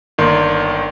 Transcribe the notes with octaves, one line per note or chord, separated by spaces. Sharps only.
G1 D#3 A#3 D5 C6